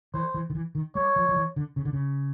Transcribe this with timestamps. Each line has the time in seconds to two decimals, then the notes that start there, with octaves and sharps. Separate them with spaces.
0.14 E3 C5
0.34 E3
0.50 D#3
0.55 E3
0.75 D#3
0.95 G3 C#5
1.16 F3
1.29 F3
1.36 E3
1.56 D3
1.76 C#3
1.85 D3
1.93 C#3